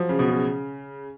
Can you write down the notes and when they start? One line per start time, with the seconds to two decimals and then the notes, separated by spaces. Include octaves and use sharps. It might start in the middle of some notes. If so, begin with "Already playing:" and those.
Already playing: F3 F#3
0.09 C#3
0.19 B2
0.29 C#3